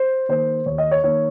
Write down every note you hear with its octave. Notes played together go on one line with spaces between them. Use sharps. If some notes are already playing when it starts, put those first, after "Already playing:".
Already playing: C5
D#3 A#3 C5
D#2 C#5
D#5
C#5
D#3 A#3 C#5